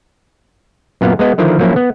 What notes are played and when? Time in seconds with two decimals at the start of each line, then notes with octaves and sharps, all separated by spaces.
1.01 F#2 A#2 B3 F5
1.19 G#3 B3 D#5
1.38 D3 D#3 F3 E4 A#4
1.59 F3 F#3 A#3 C#4 E4
1.76 B3